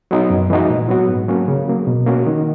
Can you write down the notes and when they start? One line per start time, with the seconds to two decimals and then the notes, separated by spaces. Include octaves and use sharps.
0.11 F#3 B3 D#4
0.30 F#2
0.50 E3 G#3 D#4 F#4
0.70 A#2
0.89 F#3 B3 F#4
1.08 G#2
1.28 F#3 A#3 C#4
1.48 C#3
1.68 F#3 A#3
1.87 B2
2.06 A#3 C#4 F#4
2.26 D#3